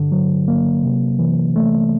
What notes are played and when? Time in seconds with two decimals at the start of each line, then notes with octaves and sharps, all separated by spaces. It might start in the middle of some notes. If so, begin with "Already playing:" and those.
Already playing: G2 D3
0.12 F#3
0.48 A#3
0.84 C3
1.19 E3
1.56 A3